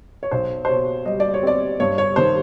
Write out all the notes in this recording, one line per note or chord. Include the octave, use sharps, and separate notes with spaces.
C#5
B1 C5
C5
B2 C#5
G3 D#5
D5
C#5
C4 D5
G2 C#5
C#5
D#3 C5